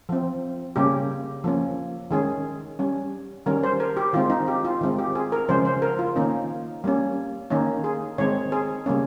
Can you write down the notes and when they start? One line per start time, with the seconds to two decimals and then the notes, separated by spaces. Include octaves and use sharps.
0.09 F3 C4
0.76 C#3 G3 A#3 C#4 G4
1.44 F3 A#3 C#4
2.11 D#3 G#3 C#4 G#4
2.79 G3 C#4
3.46 D#3 G3 C#4 A#4
3.63 C5
3.80 A#4
3.97 G4
4.13 D#3 G#3 C4 F4
4.30 D#4
4.48 G4
4.65 F4
4.81 D#3 G#3 C4
4.98 G4
5.15 G#4
5.32 A#4
5.49 C#3 F3 G#3 C#4 C5
5.65 C5
5.82 A#4
5.99 F4
6.16 D#3 A#3 C#4 D#4
6.84 G3 A#3 C#4
7.50 D#3 A#3 C#4 D#4
7.84 G#4
8.18 D#3 G#3 C4 C#5
8.52 G#4
8.86 C#3 G3 A#3 C#4